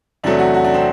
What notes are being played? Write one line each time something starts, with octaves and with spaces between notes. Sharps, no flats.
E2 C3 F#3 A3 D4
F#4
F#4
D4
C4